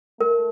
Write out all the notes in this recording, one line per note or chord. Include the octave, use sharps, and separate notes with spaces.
A3 A#4